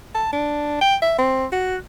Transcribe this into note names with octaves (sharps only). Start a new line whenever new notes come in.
A5
D4
G5
E5
C4
F#4